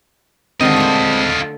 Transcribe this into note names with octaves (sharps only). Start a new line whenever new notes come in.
D3 D#3 G#3 C4 F4 D#5
A3 C5